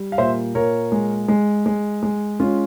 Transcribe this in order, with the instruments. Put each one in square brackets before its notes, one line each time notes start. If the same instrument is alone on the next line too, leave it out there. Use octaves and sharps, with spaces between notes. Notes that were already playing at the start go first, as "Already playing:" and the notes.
Already playing: [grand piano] G3
F5
A#2 C5 E5
A#2 A#4 C#5
G#3
G#3
G#3
G#3
G#3 C#4 F4